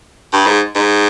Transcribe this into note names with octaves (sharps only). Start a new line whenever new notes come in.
G2
G#2
G#2